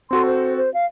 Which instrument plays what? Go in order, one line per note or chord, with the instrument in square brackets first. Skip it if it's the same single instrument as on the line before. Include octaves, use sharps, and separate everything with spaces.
[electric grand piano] C4 F#4 A4 [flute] C6
[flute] C5
C5
F5